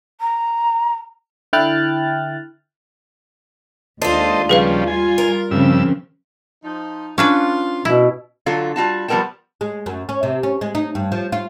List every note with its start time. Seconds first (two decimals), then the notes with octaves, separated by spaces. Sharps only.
0.20 A#5
1.53 D3 E4 G5 F6 F#6 A6
4.02 D#2 G#3 D4 F4 A4 C5 D#5
4.49 C#3 F3 G3 G#4 B4 F5
4.87 G3 F4 G#5
5.18 A#4
5.51 G2 C#3 F3 C4 E6
6.63 F3 D#4
7.18 C#4 D4 F4 B4
7.85 B2 A#3 E4
8.46 D3 F#3 F4 A4
8.76 G3 F4 F#4 A5
9.08 F3 G3 B3 A#4 G5 A5
9.61 G#3
9.86 F#2
10.09 C#4
10.23 C3
10.43 C#4
10.61 G#3
10.75 D#4
10.95 G2
11.12 F3
11.32 F4